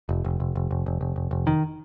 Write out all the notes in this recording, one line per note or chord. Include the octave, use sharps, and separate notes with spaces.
F1
F1
F1
F1
F1
F1
F1
F1
F1
D#3